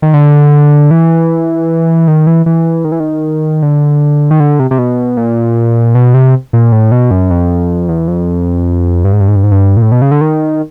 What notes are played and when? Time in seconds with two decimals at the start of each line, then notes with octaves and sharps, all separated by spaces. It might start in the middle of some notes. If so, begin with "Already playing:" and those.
0.02 D#3
0.14 D3
0.91 E3
2.07 D#3
2.27 E3
2.46 E3
2.84 D#3
2.92 E3
3.00 D#3
3.62 D3
4.31 D#3
4.40 D3
4.59 C3
4.71 C3
4.78 B2
5.17 A#2
5.95 B2
6.14 C3
6.53 A#2
6.72 A2
6.92 B2
7.11 F#2
7.30 F2
7.89 E2
8.08 F2
9.05 G2
9.13 G#2
9.20 G2
9.28 G#2
9.36 G2
9.44 G#2
9.51 G2
9.77 A#2
9.82 A2
9.92 B2
10.02 C#3
10.12 D3
10.21 D#3